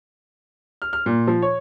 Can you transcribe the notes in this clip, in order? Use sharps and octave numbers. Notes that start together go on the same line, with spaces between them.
F6
F6
A#2
F3
C#5